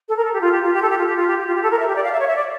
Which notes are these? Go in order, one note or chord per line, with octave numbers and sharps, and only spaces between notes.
A4
A#4
A4
G4
F4
G4
F4
G4
A4
G4
F4
G4
F4
G4
G4
F4
G4
A4
A#4
E5
G4
D5
F5
E5
C#5
E5
D5